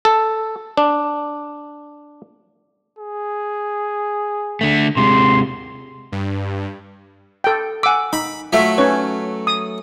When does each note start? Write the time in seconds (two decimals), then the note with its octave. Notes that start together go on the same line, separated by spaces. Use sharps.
0.05 A4
0.77 D4
2.98 G#4
4.61 D3 A3
4.97 C3 G#3 C6
6.12 G2
7.44 A4 G5
7.83 F#5 G#5 D6 E6
8.13 D#4 B5
8.53 F#3 A3 F4 E5 B6
8.78 C#4 D#4 B4 C#5
9.47 D#6